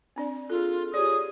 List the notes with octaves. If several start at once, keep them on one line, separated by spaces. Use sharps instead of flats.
C4 D4 D5
F4 G#4 A4
G4 G#4 C#5 D5 D#6